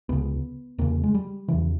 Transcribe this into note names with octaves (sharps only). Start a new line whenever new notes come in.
C#2 C#3 B3
E2 C#3 A#3
G#3
G3
E2 C#3 E3